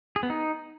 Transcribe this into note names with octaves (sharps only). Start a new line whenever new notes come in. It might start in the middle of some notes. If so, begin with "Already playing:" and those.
G#4
B3
D#4